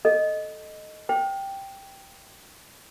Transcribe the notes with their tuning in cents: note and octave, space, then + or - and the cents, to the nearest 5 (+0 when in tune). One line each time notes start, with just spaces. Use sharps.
A4 +0 D#5 +0
C5 -20 G5 +0